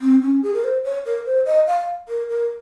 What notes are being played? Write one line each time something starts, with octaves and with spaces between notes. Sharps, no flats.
C4
C#4
G#4
A#4
C5
C#5
A#4
C5
D#5
F5
A#4
A#4